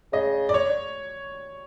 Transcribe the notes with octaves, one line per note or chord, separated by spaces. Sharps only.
C#3 D#5
D5
C#5